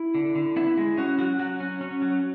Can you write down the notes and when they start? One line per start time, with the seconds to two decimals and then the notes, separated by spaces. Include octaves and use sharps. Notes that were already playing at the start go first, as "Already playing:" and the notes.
Already playing: E4
0.15 D3
0.35 D3
0.56 B3 E4
0.78 G#3
0.97 C#4 F#4
1.19 F#3 F#4
1.39 F#3 F#4
1.60 C#4
1.81 C#4
2.02 F#3